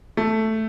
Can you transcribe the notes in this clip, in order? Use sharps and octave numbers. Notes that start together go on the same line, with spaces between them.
A3